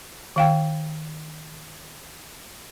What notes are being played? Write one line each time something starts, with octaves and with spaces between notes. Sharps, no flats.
D#3 F5 G5